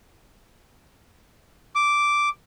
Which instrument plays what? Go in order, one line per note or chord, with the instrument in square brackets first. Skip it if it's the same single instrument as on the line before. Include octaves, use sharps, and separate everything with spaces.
[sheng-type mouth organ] D6